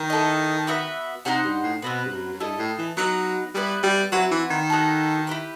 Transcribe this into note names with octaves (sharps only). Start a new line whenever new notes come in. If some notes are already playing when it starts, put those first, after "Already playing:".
Already playing: D#3
E4 A4 D#5
B3 F#4 B4 E5
C3 D#4 G4 C5 F#5
G2
A2
B2 C4 F#4 B4
G2
F#2
F#2
G2 E4 A4 D#5
A2
E3
F#3 B3 D#4 F#4 B4
G3 B3 E4 B4
G3
F#3 C4 E4 B4 F#5
E3
D#3
D#4 F#4 A4
E4 G4 B4